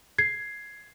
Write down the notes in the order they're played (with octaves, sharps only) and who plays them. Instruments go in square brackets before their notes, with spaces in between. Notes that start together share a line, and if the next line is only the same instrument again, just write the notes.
[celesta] G#6 C7